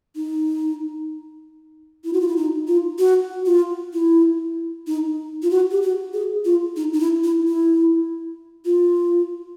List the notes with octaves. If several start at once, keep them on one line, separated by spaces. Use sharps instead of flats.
D#4
E4
F#4
F4
E4
D#4
F4
F#4
F4
E4
D#4
F4
F#4
G4
F#4
G#4
F4
D#4
D#4
E4
E4
E4
F4